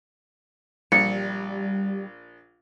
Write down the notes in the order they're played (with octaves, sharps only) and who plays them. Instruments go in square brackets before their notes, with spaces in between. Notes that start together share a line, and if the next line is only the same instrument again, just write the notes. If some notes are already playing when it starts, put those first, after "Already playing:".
[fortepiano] A#1 [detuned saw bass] G3 [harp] C#7